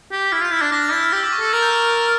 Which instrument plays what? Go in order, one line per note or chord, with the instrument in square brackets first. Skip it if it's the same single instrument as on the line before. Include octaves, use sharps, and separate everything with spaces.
[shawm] G4
[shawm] E4 [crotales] F6
[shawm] F4 [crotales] G6
[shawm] E4
[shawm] D4 [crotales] F6
[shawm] D4 [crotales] A#6
[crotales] A6
[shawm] E4 [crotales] G6
[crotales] F6
[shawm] G4 [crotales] E6
[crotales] D6
C#6
[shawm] A4 [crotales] E6
[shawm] A#4 [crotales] A6
[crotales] G6
F6
G6